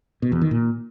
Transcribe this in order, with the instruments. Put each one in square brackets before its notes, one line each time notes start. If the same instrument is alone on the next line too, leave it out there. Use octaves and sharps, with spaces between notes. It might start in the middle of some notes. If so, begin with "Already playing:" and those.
[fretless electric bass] B2
E2
D#3
A#2